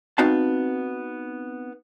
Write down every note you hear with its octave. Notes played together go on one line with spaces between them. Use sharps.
B3 C4 D#4 F#4 F5 A5